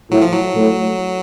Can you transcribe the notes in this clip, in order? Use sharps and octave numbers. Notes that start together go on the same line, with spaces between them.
A2 F#3
F3
F#3
A2